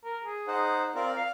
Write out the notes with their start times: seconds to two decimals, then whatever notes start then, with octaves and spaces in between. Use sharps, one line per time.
0.04 A#4
0.24 G#4
0.48 D#4 C5 F#5
0.95 C4 F4 A#4 D5
1.16 D5 F5